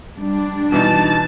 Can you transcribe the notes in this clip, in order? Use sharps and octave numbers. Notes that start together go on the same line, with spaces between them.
G3 D4
B2 E3 D#4 A5